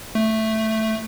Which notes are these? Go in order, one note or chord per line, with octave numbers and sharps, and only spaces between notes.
A3